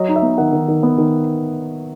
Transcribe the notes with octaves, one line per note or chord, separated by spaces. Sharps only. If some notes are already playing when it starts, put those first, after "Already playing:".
Already playing: F#3 D#5
D#4
E5
B3
D#3 F#5
D#3
D#3
B3
D#3